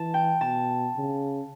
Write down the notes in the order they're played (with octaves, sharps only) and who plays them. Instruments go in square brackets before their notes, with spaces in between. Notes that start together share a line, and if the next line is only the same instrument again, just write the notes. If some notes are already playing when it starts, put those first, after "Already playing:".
Already playing: [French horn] E3 [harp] A5
[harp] G5
[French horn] B2 [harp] A5
[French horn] C#3